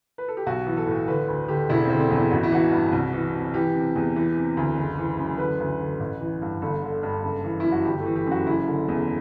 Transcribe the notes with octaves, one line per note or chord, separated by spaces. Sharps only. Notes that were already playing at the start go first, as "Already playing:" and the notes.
B4
A4
G4
B1 F#4
E3
A4
A2
D3 B4
D2
D3 G4
E1 E4
C4
D3
C4
E2
E4
A1 F#4
E4
E3 F#4
G2
C2
E3
C3
E3 G4
C3
E2
E3
C3
D2
F#1
E3
F#2
D3 B4
D2
D3
A1
E3
G2
G1 A4
D3
G2
F#1 A4
E3
F#2 E4
F#4
G1 G4
A3
E3
G4
F#2
F#4
F#1 E4
D3
E2